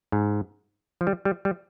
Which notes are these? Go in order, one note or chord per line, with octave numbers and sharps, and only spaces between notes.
G#2
F3
G3
G3
G3